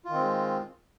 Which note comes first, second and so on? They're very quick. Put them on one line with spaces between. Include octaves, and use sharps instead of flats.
F4 D#3 C4 G#3